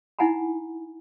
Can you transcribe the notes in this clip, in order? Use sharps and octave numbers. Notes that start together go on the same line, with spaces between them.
D#4 E4 F#5 G#5 A#5 B5